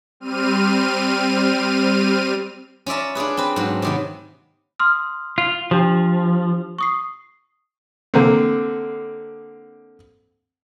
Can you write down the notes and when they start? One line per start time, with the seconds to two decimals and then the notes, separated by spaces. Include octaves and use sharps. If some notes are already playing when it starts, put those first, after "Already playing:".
0.20 G3 C4 F6 D#7
2.86 C#4 F4 D5 E5 A#5
3.15 D4 F4 G#4 B4
3.37 C4 B4
3.56 G#2 F#3
3.82 C3 D#3 B3
4.79 C6 D#6 F6
5.38 F4
5.71 F3 D4 G4
6.78 C#6 D#6 C7
8.14 D3 A#3 C4